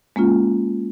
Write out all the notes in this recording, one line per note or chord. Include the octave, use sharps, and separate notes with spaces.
G#3 A#3 C#4 F4